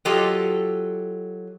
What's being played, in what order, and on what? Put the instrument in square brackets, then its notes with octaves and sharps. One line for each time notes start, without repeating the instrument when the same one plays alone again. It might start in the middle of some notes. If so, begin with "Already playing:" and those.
[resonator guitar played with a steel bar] F#3 F4 G4 A4 D#5